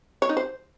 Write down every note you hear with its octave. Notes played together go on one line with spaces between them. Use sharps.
C#5
D#4
C5